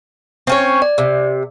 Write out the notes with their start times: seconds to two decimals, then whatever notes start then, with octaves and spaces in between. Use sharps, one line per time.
0.47 C4 C#4 C#5
0.82 D5
0.98 C3